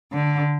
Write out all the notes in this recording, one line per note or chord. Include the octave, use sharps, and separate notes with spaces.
D3